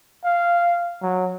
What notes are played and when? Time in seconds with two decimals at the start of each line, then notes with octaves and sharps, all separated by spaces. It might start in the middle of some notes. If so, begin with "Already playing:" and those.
0.25 F5
1.02 F#3